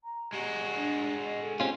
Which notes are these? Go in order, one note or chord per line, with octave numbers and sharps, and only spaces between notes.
A#5
G#3 F#4 G4
D4
D#5
A4
C4 C#4 F4 G4